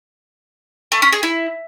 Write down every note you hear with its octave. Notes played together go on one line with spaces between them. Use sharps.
A3
C#4
G#4
E4